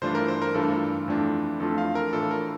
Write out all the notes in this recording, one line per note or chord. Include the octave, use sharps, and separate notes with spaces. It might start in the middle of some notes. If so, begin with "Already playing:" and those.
G2 E3 A3 D4 F4 C5
A#4
C5
A#4
G2 E3 A3 D4 F4 A4
F2 E3 A3 D4 F4
F2 E3 A3 D4 F4 A4
F5
A#4
A2 E3 A3 D4 F4 A4
A#4